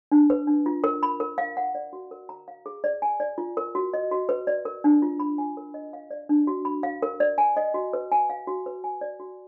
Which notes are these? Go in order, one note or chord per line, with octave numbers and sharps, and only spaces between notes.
D4
B4
D4
F4
A#4
B5
A#4
F5
F#5
D5
F#4
A#4
A#5
F5
G#4
D5
G#5
D5
F4
A#4
F#4
D#5
F#4
B4
D5
A#4
D4
F4
B5
G#5
A#4
D#5
F5
D5
D4
F#4
B5
F5
A#4
D5
G#5
D#5
F#4
B4
G#5
F5
F#4
B4
G#5
D5
F#4